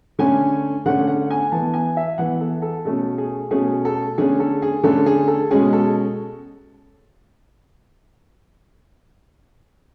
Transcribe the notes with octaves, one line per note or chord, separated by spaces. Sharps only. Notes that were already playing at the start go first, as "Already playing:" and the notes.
D3 A3 C#4 G#5
D3 A3 C#4 F#5
F#5
G#5
E3 B3 A5
G#5
E5
E3 B3 F#5
A4
A4
B2 A3 C#4 A4
G#4
B2 A3 C#4 G#4
A4
D3 A3 C#4 G#4
A4
G#4
D3 A3 C#4 A4
G#4
A4
B2 G#3 C#4 G#4
A4